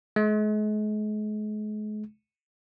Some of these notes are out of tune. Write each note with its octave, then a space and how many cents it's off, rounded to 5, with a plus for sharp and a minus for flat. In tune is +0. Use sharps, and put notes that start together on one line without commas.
G#3 +40